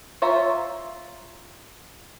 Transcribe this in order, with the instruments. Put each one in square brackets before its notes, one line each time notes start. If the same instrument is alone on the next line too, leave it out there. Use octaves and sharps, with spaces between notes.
[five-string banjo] F4 C5 C#5 E5 A#5